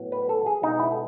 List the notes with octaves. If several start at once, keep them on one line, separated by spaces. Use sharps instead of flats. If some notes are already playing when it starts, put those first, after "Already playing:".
Already playing: A2 F#3 B3
B4
A4
G#4
B2 G#3 B3 D#4
E4
A4